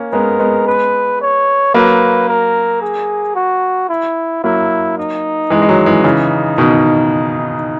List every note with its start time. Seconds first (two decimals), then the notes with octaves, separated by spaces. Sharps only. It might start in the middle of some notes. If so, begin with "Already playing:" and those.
Already playing: A#3 C#4
0.13 G#3 B3 A#4
0.39 G#3 B3
0.67 B4
1.21 C#5
1.74 F#3 A#3 B4
2.29 A#4
2.81 G#4
3.35 F#4
3.89 E4
4.44 F#3 A#3 E4
4.98 D#4
5.50 E3 G#3
5.62 G#3
5.68 D#3 F#3
5.86 E3 G#3
6.04 C#3 E3 D#4
6.58 B2 D#3